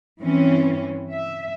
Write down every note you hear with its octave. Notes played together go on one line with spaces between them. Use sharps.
G2 E3 C4 C#4
E5